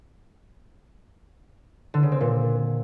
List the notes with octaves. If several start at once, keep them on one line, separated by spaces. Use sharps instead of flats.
D3
C#3
C4
A#2